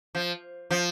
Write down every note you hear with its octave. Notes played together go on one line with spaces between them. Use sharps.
F3
F3